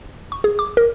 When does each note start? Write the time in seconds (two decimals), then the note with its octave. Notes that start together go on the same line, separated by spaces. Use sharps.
0.32 C#6
0.44 G#4
0.59 D6
0.77 A#4